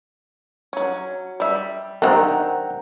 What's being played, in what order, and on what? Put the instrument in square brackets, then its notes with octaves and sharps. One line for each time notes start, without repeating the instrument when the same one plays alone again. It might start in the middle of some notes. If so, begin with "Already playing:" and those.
[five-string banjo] F#3 C#4
G3 E5
[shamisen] D#3 C#4 D4 [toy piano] A#4 C5 [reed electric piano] F#5 G5 A#5